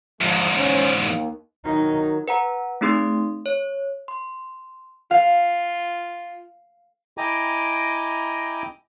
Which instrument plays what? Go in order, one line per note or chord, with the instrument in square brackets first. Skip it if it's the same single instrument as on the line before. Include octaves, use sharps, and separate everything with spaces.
[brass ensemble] G1 F3 G#3 [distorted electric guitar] E2 G#2
[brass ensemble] C#4 C5
D#2
[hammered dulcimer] D#3 F#3 [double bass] D#4
[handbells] B4 F#5 A#5
A3 C4 D#4 G#4 C6 D#6
C#5
C6
[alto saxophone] F4 [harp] F5
[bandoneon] E4 D#5 G5 G#5 A#5 D6